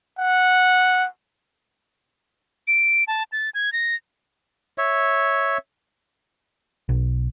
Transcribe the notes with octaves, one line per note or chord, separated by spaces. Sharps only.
F#5
D7
A5
A6
G#6
A#6
C#5 E5
B1